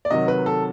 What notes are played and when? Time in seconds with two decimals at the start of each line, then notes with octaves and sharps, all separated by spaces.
0.05 D5
0.11 C3 D#3 F#3 D#5
0.28 B4
0.46 A4